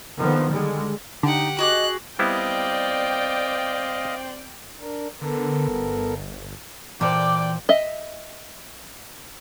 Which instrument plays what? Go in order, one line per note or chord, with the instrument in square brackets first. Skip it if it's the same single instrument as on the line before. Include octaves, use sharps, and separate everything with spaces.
[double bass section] D3 D#3 F3 B3
D3 G3 G#3
[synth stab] D3 [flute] D#4 [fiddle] G4 F#5
[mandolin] F#4 G#4 D6 [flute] D#5 [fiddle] F#6
[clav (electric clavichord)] G3 B3 E4 [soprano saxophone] C4 [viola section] D5 G5 [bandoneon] D#5 F5
[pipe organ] D4 A#4
[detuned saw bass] D3 [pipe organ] B3 A4 A#4
[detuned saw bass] G1
[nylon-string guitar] A#2 C5 [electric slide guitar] E3 A5 [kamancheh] D5 G5 [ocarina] D6
[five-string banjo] D#5 E5